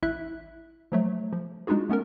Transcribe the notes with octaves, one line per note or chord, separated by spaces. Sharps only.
A1 E4 E5 F#6
F3 F#3 A3
F3
G#3 D4 D#4 F4 F#4 G#4
A3 B3 C#4 A#4